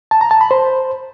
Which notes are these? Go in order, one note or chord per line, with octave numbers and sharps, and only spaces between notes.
A5
A#5
A5
B5
C5